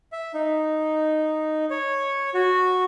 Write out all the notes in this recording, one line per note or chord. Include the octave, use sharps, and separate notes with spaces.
E5
D#4
C#5
F#4